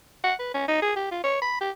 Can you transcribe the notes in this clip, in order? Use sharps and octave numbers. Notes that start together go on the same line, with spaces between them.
F#5
B4
C#4
D#4
G#4
G4
F4
C#5
B5
G4